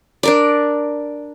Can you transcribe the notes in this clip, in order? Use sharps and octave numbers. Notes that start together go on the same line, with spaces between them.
D4 A#4 D5